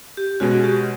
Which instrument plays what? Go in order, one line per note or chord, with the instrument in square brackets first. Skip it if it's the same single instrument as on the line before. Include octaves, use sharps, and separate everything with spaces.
[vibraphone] G4
[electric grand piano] B2 G#3 C#4 [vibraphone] F#4
[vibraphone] G4